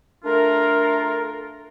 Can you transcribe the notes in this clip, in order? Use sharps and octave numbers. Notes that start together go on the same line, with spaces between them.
A3 D4 F4 A#4